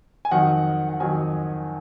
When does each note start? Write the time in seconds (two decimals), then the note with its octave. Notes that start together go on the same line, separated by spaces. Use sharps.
0.25 G#5
0.31 F2 D#3 F#3 F#5
0.89 F#5
1.00 F2 D#3 F#3 G#5